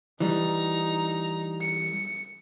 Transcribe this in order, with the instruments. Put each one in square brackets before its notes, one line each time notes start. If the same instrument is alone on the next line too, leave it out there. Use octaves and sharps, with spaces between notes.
[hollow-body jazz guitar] E3 G3 [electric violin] D#4 A#5
[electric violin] C#7